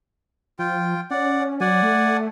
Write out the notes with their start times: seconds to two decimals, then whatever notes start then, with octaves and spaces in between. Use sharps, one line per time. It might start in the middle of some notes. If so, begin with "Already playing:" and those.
0.59 F3 F4 G5
1.10 C#4 D5 F#5
1.61 F#3 D5 F#5 G#5
1.83 A3